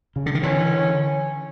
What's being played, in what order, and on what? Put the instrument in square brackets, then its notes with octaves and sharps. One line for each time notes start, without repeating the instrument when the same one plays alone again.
[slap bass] C#3
D3
D#3
[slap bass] D3 E3 [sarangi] C#4